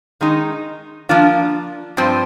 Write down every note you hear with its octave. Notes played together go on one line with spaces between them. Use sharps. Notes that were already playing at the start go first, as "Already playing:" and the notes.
D#3 G#3 D#4
F3 A#3 D4 F4
G2 F3 C4